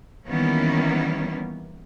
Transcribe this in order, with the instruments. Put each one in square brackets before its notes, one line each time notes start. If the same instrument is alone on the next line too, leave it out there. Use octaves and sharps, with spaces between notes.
[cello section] D#3 E3 G3 A#3 B3 C#4